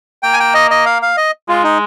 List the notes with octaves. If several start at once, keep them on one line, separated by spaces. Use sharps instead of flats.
A#3 G5
G#5
G5
D#5
D#5
F5
F5
D#5
G#3 F4
D#4